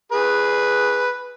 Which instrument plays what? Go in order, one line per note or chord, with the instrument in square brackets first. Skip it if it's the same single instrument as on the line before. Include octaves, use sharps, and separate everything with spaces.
[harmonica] G#4 B4